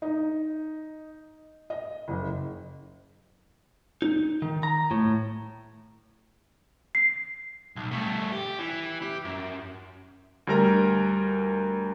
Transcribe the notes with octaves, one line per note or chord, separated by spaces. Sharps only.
D#4
D#5
F#1
D#4
D#3
A#5
A2
C7
B1
G3 A3
G4
E3
G4
F#2
D2 G3 A#4 A#5